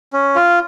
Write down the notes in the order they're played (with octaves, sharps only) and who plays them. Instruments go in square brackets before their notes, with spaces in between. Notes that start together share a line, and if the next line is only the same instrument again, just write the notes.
[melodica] C#4
F4